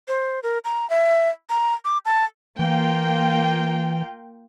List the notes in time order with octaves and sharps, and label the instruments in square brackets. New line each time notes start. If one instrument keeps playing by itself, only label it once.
[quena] C5
A#4
A#5
E5
A#5
D6
A5
[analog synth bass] E3 [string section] A#3 F4 G5